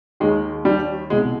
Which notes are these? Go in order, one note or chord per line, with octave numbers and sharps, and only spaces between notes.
D#2 D#3 G#3
G3
C2 B2 G#3